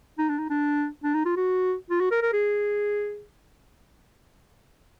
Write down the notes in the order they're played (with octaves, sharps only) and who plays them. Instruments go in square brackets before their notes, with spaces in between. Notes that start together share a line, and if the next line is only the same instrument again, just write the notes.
[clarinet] D#4
D4
D#4
D4
D4
D#4
F4
F#4
F4
F#4
A#4
A#4
G#4